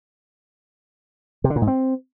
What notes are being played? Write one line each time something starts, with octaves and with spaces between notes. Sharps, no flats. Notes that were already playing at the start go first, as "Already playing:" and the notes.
C3
D3
A#2
G#2
C4